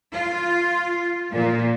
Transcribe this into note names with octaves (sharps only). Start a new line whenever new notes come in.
F4
A#2